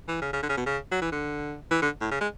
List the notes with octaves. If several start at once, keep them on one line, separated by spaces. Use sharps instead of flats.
E3
C#3
C#3
D3
C#3
B2
C#3
F#3
E3
D3
E3
D3
A2
C#3
G#3